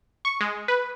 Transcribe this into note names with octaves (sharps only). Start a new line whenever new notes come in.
C#6
G#3
B4